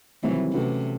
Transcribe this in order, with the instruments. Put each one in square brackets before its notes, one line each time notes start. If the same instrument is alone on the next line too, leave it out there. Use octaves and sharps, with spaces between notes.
[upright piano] C3 D#3 G3 C4 E4 [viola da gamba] E3 F#3
[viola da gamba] C3 [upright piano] A3 C#4 F#4 B4